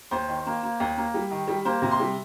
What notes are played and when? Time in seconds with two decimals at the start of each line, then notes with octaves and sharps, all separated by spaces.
0.11 D#2 C5
0.28 D#3
0.47 A#3
0.63 A#3
0.80 D#2
0.98 A#3
1.14 G3
1.31 D#3
1.48 G3
1.65 A#3 C5
1.82 C3
1.91 C6
2.00 G3